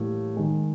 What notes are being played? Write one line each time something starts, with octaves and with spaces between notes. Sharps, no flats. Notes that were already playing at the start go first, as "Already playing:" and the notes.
Already playing: A2 E3 G3 A#3
D#3 G#3